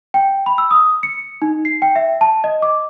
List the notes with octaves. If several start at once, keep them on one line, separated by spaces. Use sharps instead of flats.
G5
B5
E6
D#6
C#7
D#4
C7
G5
E5
A5
D#5
D6